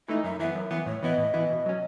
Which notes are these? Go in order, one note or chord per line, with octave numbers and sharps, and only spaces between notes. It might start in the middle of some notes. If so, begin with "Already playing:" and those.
E3 A3 D#4 E5
F#2 E5
E3 B3 E5
F#2
E3 B3 E5
A2 C#5
E3 B3 E4 D#5
A2
E3 B3 E4
B2
F#3 C#4